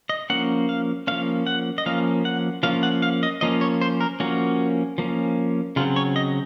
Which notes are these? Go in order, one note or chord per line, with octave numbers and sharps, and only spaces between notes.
D#5
F3 A#3 C#4 F#5
F5
F3 A#3 C#4 F5
F#5
D#5
F3 A#3 C#4 F5
F#5
F3 A#3 C#4 F5
F#5
F5
D#5
F3 A#3 C#4 D#5
C#5
C5
A#4
F3 A#3 C#4 F#4
F3 A#3 C#4
C#3 F#3 C4 F4
C#5
D#5